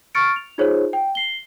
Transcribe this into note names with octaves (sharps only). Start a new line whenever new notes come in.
C#6 F6 A6 C#7 D7
F7
D#4 F4 G#4 C5 C#5
G5
C7 G7